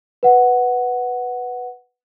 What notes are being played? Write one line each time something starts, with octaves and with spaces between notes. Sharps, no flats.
B4 F#5